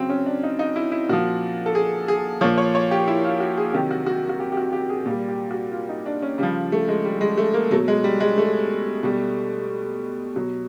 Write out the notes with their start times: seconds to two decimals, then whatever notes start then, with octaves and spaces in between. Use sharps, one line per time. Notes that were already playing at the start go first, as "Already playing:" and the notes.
Already playing: C#3 F#3 C4
0.10 C#4
0.26 D4
0.43 D#4
0.59 D#4
0.76 E4
0.92 E4
1.09 A#2 F3 F#4
1.66 A4
1.75 G#4
2.08 G#4
2.41 A#2 F3 C#5
2.58 C#5
2.75 C#5
2.91 G4
3.08 E4
3.24 F4
3.40 F#4
3.57 G#4
3.74 C3 D#3 F#3 G4
3.91 F#4
4.06 F#4
4.29 F#4
4.40 G4
4.52 G4
4.57 F#4
4.73 G4
4.89 G#4
5.06 A#2 G3
5.28 G4
5.51 F#4
5.72 F4
5.89 D#4
6.06 D4
6.22 C#4
6.38 C#3 G3
6.43 F3
6.72 A3
6.88 G#3
7.05 G3
7.21 G#3
7.38 A3
7.54 A#3
7.71 B2 F#3 A3
7.88 G#3
8.04 G3
8.20 G#3
8.38 A3
9.03 B2 G3
10.36 B2 F#3